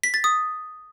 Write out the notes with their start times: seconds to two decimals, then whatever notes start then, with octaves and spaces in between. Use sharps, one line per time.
0.03 B6
0.14 A6
0.24 D#6